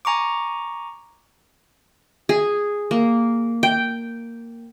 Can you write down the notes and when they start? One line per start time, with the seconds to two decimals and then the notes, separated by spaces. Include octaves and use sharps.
0.05 G#5 A#5 C#6 D6
2.29 G#4
2.91 A#3
3.63 G5